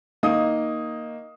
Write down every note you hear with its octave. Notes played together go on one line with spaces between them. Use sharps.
D#3 A#3 D#5 D#6